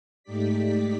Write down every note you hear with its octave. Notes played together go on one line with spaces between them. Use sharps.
G#2 A3 D#4 G4 D5 B6